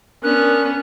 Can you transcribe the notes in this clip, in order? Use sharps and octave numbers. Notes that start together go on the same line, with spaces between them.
B3 C#4 D4 A#4 F#6